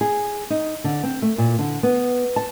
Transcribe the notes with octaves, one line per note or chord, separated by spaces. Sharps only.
G#4
D#4
D3
C4
A3
A#2
D3
B3
A5